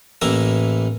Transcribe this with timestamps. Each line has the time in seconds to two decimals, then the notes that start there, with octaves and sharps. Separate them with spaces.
0.21 A1 E3 A#3 E4 E5 A#5